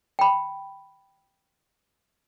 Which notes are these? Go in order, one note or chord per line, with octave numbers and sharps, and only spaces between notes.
G5 B5